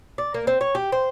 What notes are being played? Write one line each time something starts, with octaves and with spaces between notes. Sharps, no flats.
D5
A#3
C4
C#5
G4
C5